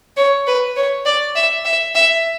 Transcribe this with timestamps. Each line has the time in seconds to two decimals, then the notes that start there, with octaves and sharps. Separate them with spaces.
0.17 C#5
0.47 B4
0.76 C#5
1.06 D5
1.35 E5
1.65 E5
1.95 E5